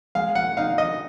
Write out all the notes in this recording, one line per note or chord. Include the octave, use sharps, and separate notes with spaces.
G#3 F5
F#5
D#4 F5
D#5